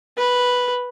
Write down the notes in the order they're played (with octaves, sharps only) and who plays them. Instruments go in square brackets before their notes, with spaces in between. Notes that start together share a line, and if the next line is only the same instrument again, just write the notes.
[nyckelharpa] B4